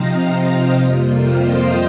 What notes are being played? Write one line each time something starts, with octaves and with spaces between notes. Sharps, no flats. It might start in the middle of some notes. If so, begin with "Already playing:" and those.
Already playing: C3 F3 C4 D#4 F5 A#5
F2 C3 G3 A#3 F4 D#5 G5
C5 F5
D#5 G5